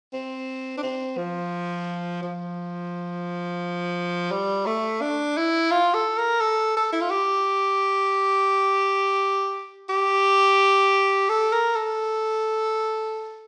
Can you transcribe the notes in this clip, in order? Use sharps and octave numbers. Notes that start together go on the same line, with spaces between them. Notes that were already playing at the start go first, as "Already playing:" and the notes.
C4
D4
C4
F3
F3
G3
A3
D4
E4
F4
A4
A#4
A4
A4
E4
F4
G4
G4
A4
A#4
A4